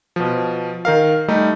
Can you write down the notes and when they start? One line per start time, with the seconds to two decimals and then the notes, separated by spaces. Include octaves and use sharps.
0.16 B2 F3
0.85 D#3 A#4 F5
1.28 G3 A3 D#4